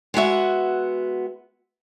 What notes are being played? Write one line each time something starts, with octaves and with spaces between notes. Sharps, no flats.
G#3 B3 F#4 E5